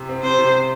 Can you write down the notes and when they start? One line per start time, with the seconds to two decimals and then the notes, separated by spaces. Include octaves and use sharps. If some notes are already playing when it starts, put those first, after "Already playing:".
Already playing: C3
0.09 C4
0.23 C3 C5
0.39 C3
0.53 C3